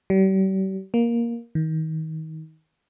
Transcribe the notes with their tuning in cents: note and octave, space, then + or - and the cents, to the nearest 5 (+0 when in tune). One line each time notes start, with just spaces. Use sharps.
G3 -40
A#3 +10
D#3 +30